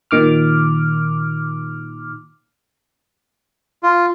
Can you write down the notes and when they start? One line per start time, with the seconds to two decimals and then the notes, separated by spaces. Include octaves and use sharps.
0.11 A#2 D#3 D6 F6
3.83 F4